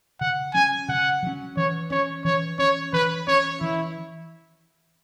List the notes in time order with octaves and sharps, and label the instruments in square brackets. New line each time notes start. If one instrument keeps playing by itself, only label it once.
[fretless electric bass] C#3 [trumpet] F#5
[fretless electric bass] F#3 C#4 [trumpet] G#5
[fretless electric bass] C#3 [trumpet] F#5
[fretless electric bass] F#3 C#4
[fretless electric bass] E3 [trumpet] C#5
[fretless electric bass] C#4 [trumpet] C#5
[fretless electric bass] E3 [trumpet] C#5
[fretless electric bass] C#4 [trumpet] C#5
[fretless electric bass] E3 [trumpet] B4
[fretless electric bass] C#4 [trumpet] C#5
[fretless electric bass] E3 [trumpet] E4